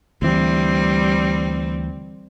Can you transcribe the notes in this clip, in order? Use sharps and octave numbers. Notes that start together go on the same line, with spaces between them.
D2 E3 G3 C4